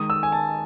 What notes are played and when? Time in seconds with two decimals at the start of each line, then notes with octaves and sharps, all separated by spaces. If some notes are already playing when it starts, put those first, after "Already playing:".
Already playing: D#3 G#3 D#6
0.10 E6
0.23 G#5
0.32 A5